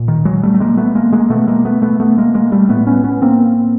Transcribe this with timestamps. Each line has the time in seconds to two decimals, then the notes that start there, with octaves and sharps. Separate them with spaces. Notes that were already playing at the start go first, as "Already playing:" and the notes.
Already playing: A#2
0.08 D#3
0.25 F#3 G#3
0.43 G3 A3
0.54 A3
0.60 G#3 A#3
0.77 A3 B3
0.95 G#3 A#3
1.12 G#3 A#3
1.30 B2 A3 B3
1.47 G#3 A#3
1.65 A3 B3
1.82 A3 B3
2.00 A3 B3
2.18 G#3 A#3
2.34 G#3 A#3
2.52 G3 A3
2.69 A2 A3 B3
2.87 B3 C#4
3.04 B3 C#4
3.22 A#3 C4